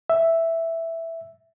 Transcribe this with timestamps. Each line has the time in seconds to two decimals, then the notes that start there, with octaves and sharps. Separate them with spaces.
0.10 E5